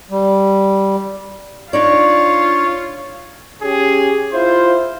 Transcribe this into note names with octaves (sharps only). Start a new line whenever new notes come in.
G3
D4 D#4 F4 C#5 D5
C#4 G4 G#4
E4 F4 C5